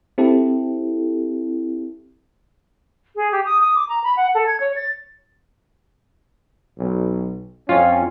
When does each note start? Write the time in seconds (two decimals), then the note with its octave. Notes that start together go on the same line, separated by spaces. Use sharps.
0.18 C4 E4 G4 A4
3.16 G#4
3.32 G4
3.45 D#6
3.61 D#6
3.75 D6
3.89 A#5
4.04 B5
4.17 F#5
4.35 A4
4.47 G#6
4.60 C#5
4.76 A6
6.79 B1
7.69 F2 C#4 F4